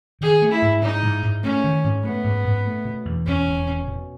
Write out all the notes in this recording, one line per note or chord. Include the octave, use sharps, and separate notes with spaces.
D#3 G#4
A3
E4
G#2
G#2 D#4
G#2
G#2
A3 C#4
D#3
G#2
A3 B3
G#2
G#2
A3
B2
E2
E2 C#4
E1
B2
B2